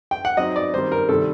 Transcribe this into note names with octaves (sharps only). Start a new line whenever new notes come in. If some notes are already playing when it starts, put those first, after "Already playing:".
G5
F#5
F#3 C4 D#4 D#5
D5
D#3 G3 C4 D#4 C5
A#4
C3 D#3 G3 D4 A4